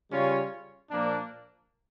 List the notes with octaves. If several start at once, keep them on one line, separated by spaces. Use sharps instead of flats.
C#3 G3 C#4 F4 C#5
A#2 F3 A#3 D4